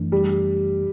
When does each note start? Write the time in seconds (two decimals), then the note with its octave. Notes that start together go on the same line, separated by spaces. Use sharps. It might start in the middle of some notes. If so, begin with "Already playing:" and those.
Already playing: F#2 E3 A3 D4
0.12 G3